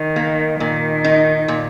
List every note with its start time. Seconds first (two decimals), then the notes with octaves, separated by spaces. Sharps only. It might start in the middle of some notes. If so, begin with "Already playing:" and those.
Already playing: D#3
0.16 A#3
0.60 A#2 D#3
1.04 D#4
1.48 A#2